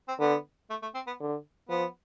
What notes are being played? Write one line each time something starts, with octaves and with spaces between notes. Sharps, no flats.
C4
D3 B3
A3
A3
C4
B3
D3
F3 B3